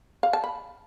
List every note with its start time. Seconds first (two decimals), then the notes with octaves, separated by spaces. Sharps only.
0.23 F5
0.33 A5
0.44 B5